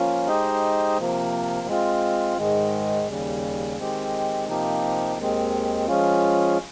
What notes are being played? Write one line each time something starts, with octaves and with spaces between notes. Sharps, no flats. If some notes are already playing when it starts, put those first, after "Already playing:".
Already playing: F3 A#3 C#4 F4
G#3 D#4 G4 C5 D#5
C3 F3 A#3
G#3 C4 F4
G#2 D#3 G#3
D#2 C#3 G3
D#3 G#3 C4 G4
C3 F3 A#3 D#4 G4
D#2 D#3 G#3 C4
F3 G#3 C#4 F4